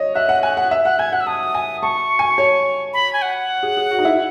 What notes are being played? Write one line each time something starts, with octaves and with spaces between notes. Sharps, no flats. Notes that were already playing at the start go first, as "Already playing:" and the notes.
Already playing: C#5 D#5
E5 F#6
F#5
G#5 F#6
F#5
E5
F#5 F#6
G#5 G#6
F#5 F#6
E6
A5 D#6
G#5
A5 C#6
G#5
C#5
B5
G#5
F#5
G#4
G#4
F#4
D#4
E4